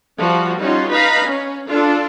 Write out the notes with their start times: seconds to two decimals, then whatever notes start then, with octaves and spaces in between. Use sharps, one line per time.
0.17 F3 G3 F#4
0.59 G3 C#4 D#4 F4 F#4
0.90 D#4 B4 F5 A#5 B5
1.24 C#4
1.69 D4 F4 A4